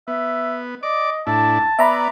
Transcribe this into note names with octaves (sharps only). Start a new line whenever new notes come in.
B3 E5
D5 D#5 D6
A2 D4 E4 A5
B3 D5 E5 A#5 B5